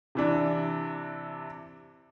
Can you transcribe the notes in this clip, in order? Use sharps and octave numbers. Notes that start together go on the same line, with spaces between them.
C3 E3 D4